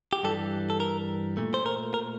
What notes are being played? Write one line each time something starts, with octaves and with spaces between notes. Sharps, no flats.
G4
G2 E3 G3 A4
A4
A#4
A#2 A3
C5
A#4
A#4